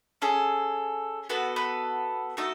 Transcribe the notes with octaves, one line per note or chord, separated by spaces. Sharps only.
C#4 G#4 A4
B3 F#4 A4 B4
B4
A3 D#4 F#4 A4